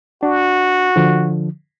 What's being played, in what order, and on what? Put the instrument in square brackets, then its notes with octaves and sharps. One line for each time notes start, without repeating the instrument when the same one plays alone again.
[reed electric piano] D4 [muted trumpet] F#4
[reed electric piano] D3 F3